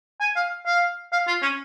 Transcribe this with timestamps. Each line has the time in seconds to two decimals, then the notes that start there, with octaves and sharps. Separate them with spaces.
0.21 G#5
0.36 F5
0.66 F5
1.12 F5
1.27 F4
1.42 C#4